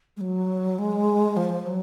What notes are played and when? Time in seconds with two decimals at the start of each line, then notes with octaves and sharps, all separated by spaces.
0.17 G#3
0.21 F#3
0.79 G#3
1.37 F3
1.66 F#3